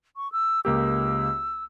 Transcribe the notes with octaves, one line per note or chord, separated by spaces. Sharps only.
C#6
E6
C#2 A#3 G4 E6